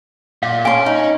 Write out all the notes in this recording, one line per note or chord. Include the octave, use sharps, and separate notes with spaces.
A#2 F5
C#4 C#5 G#5 A5 C6
D#4